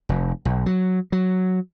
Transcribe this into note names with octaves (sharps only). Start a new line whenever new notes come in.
F1
B1
F#3
F#3